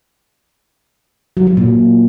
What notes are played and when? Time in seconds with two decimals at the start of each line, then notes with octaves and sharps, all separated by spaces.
1.37 F#3
1.47 F#3
1.57 A#2